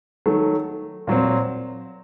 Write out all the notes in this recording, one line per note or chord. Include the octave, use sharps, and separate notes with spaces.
D#3 F#3 A3
A#2 F#3 C4